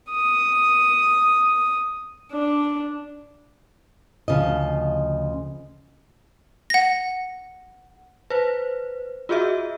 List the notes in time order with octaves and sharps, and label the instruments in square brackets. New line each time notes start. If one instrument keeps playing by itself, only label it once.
[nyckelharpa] D#6
D4
[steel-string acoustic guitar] D2 C#3 F3 D#5
[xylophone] F#5 A#6
[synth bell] B4 C5
F4 F#4 G#4 D#5 E5